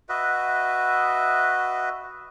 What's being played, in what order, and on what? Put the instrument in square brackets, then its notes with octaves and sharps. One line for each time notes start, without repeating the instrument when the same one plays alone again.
[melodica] F#4 B4 D#5 E5